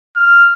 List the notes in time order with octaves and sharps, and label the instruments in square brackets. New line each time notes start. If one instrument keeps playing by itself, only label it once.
[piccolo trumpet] F6